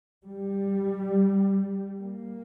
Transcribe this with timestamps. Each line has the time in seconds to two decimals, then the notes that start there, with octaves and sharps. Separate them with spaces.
0.23 G3
1.98 A#3